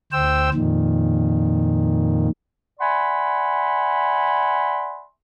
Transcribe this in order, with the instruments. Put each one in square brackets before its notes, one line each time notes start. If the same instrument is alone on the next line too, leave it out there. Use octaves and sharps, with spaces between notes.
[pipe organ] D2 C5 G5 E6
F2 A#2 D#3
[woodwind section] D5 E5 F#5 G#5 B5 C6